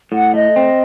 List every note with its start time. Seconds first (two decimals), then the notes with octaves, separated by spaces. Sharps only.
0.12 A2 F#5
0.34 A3 D#5
0.56 C4